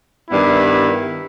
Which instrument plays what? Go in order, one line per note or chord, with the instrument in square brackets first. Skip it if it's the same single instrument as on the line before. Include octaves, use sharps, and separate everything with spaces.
[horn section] G2 D#3 G3 B3 E4